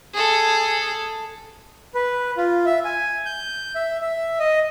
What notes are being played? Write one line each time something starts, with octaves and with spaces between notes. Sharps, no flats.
G#4 A4
B4
F4
E5
G#5
G6
E5
E5
D#5